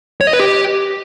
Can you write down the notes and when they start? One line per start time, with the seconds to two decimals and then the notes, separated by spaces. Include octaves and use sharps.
0.21 C#5
0.27 D#5
0.33 B4
0.40 G4